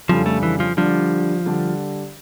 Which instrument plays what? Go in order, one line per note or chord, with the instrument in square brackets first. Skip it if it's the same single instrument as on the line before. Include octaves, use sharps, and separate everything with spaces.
[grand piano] F2 C#3 G3 D4 A4 [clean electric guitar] F3
[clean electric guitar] A3
E3
F3
[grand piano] D3 G3 D4 G4 D5 [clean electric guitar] F3
[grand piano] D3 G3 D4 G4 D5